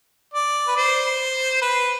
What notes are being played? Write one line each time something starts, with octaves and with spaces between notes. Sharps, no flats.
D5
B4
C5
B4